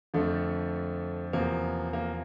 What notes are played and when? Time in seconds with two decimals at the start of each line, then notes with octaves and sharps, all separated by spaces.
0.14 F2 D3 F3 A3
1.33 E2 C3 F3 A#3
1.93 A#3